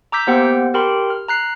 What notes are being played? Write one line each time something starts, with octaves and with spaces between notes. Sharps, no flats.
A#5 D6 E6 G6 B6
A#3 B3 G4 C5 F#5 G5
G4 A#4 G5 B5 C6
F6
A#5 F#6 C7